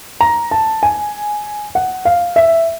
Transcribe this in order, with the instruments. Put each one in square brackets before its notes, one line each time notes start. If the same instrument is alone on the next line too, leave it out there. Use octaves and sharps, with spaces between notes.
[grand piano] A#5
A5
G#5
F#5
F5
E5